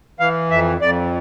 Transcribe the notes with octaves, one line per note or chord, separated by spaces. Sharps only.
E3 F5
F2 E5
F2 D5